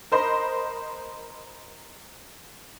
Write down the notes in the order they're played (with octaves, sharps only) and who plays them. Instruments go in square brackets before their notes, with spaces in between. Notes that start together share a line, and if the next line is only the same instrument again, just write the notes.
[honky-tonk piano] A#4 C5 D#5 B5